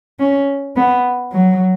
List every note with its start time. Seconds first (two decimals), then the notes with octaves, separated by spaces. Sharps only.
0.20 C#4
0.76 B3
1.32 F#3